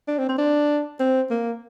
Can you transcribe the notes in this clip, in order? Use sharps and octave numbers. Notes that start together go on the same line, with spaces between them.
D4
C4
C4
D4
C4
A#3